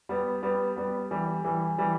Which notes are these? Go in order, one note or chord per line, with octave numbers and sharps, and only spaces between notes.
G3 B3
G3 B3
G3 B3
E3 G3
E3 G3
E3 G3